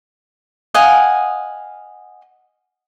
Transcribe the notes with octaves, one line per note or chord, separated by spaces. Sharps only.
D#5 F5 F#5 G#5